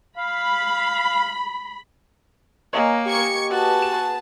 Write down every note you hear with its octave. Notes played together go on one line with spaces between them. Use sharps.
F5 B5
A#3 C#5 D#5 G#5
G4 C#6 G#6 C#7
F#4 G#4 B4 A5
E7